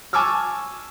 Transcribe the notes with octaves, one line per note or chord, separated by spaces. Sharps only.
G#5 A5 C#6 D6 E6 F6